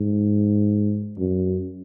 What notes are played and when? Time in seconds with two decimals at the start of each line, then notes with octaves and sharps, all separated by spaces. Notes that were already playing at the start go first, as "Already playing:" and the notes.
Already playing: G#2
1.18 F#2